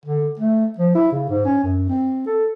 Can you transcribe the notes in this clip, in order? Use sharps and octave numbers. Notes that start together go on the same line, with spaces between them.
D3
A3
F3
E4
C#3
G#2
C#4
F#2
C4
A4